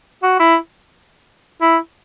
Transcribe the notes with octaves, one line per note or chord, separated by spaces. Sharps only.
F#4
E4
E4